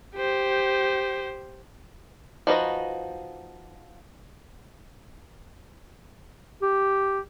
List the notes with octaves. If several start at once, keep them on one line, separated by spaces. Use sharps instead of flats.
G4 C5
F3 D#4 F#4 B4 D#5
G4